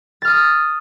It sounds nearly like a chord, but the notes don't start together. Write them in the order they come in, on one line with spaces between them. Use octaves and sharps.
A6 F6 D#6